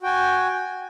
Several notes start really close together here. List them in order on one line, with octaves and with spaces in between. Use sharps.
F#4 G5 G#5